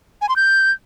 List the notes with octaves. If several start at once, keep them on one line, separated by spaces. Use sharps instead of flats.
G#5
C6
G6